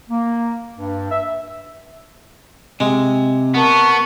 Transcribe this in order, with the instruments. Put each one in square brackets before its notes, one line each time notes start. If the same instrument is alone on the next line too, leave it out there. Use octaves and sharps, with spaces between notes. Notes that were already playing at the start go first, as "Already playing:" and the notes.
[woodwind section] A#3
G2
E5
[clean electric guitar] C3 [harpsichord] G#3
[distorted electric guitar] B3 [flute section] A#4 A5 C#6